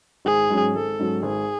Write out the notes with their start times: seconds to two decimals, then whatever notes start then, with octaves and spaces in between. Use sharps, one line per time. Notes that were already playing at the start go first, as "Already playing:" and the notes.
0.25 G#1 G#4
0.50 G#2 F#3 C#4
0.74 G#1 A4
0.99 G#2 F#3 C#4
1.23 G#1 G#4